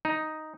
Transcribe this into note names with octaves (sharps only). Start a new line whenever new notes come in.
D#4